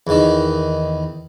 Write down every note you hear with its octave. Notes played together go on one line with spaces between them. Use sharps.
E2 D#3